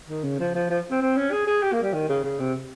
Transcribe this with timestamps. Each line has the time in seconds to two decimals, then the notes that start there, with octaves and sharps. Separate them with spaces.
0.09 D#3
0.24 C#3
0.40 F3
0.55 F3
0.70 F3
0.91 C4
1.01 C4
1.16 C#4
1.32 G#4
1.47 G#4
1.63 G4
1.72 A#3
1.83 G3
1.93 D#3
2.09 C#3
2.24 C#3
2.39 C3